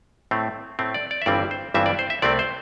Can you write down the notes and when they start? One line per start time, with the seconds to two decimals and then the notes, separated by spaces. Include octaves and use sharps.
0.31 A2 A3 C4
0.79 A2 A3 C4
0.94 D5
1.11 D5
1.22 E5
1.26 G1 G2 E3 G3 C4 D5
1.51 C5
1.74 G1 G2 E3 G3 C4 E5
1.86 D5
1.99 C5
2.10 E5
2.22 C2 C3 A3 C4 D5
2.39 C5